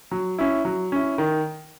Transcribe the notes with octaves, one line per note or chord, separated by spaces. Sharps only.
F#3
C#4 E4
F#3
C#4 E4
D#3